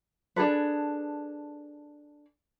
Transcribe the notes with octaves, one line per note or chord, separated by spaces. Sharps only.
D4 G#4 A4 B4